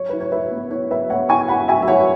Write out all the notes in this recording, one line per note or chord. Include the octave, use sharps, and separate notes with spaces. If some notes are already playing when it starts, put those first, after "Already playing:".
Already playing: F#3 C#5
E4 B4
C#5
E4 B4 E5
B3
E4 C#5
F#3 B4 E5
B3 C#5 F#5
E4 G#5 C#6
E4 F#5 B5
F#3 E5 G#5
E5
E4 C#5 F#5